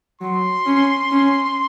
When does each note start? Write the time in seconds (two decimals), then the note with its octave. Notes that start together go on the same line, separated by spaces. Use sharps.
0.21 F#3 C6
0.66 C#4
1.12 C#4